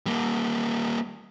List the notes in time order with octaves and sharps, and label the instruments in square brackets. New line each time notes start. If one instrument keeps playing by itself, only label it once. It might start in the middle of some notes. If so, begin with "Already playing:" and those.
[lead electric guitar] G3 A#3